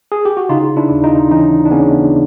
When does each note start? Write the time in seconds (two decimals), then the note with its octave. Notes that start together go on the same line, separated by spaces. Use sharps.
0.12 G#4
0.25 G4
0.37 F#4
0.49 C#3 D#4 F4
0.76 D4 E4
0.91 D#2
1.04 D#4 F4
1.31 E3 C#4 D#4
1.66 D4
1.71 C#3 B3 C#4